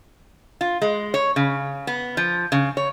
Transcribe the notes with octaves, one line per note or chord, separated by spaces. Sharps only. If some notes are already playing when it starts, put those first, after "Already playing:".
F4
G#3
C#5
C#3
B3
F3
C#3
C#5